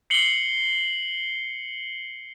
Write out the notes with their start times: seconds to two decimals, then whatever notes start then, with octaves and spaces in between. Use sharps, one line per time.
0.10 C7 C#7 F#7 G7